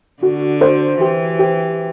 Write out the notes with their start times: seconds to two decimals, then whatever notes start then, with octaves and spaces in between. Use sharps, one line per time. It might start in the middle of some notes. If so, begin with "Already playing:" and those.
0.22 D3 F#4
0.61 C5
1.00 E3 G4
1.39 G4